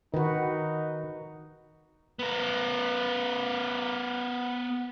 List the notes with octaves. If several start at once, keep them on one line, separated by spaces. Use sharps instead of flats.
D#3 D#4 F#4 B4
B3 A#4